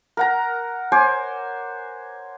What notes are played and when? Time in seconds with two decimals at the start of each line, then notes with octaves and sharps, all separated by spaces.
0.17 A#4 F#5 A#5
0.92 C5 C#5 G#5 D6